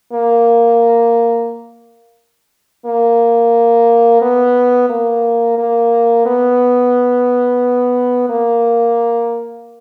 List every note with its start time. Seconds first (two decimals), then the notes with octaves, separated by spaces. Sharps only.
0.13 A#3
2.86 A#3
4.22 B3
4.89 A#3
5.58 A#3
6.26 B3
8.29 A#3